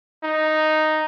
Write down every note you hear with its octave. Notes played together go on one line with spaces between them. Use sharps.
D#4